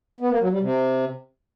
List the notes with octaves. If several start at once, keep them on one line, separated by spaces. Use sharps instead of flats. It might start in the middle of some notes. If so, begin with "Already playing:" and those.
B3
A#3
F#3
G3
C3